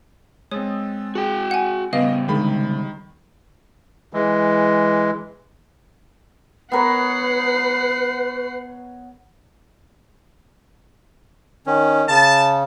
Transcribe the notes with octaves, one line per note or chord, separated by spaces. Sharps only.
G#3 C4 C#5 D#6 E6 A6
F#4 G#4 G5
F#5 G#5
C#3 G3 B3 D#5 F5
D3 D#3 G#3 B5
E3 G#3
B3 A#4 B4 C#5 F#5 C7
D#3 C#4
C#3 A5